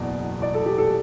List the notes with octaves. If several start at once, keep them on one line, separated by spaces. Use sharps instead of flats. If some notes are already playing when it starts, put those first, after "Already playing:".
Already playing: F#1 E2 B2 D5
D5
A4
G4
A4